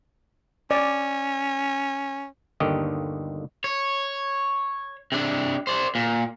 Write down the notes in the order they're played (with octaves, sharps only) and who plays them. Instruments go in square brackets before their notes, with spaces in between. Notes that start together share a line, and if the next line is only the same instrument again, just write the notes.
[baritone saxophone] C#4 [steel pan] D5
[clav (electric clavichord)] G1 D#2 D3 D#3 G4 D#5
[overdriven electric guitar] C#5
C3 D4
C5 D5
A#2